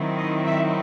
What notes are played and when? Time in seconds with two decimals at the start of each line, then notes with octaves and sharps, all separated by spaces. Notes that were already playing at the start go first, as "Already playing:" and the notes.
Already playing: D#3 F#3 C4 E4
0.17 D#5
0.46 E5